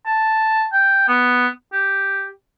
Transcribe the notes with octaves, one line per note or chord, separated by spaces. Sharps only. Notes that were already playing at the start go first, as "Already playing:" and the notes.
A5
G5
B3
G4